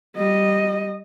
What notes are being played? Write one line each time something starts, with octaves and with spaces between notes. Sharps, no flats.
G3 D#5